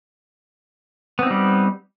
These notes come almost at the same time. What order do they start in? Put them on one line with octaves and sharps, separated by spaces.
B3 C4 D#4 G3